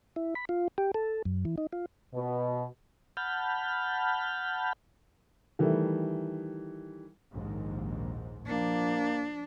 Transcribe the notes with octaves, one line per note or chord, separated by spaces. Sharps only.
E4
B5
F4
G4
A4
F#2
E3
D#4
F4
B2
F#5 A5 B5 F6 G6
D#3 E3 G3 A3
A#1 D#2 G#2
F3 A#3 D4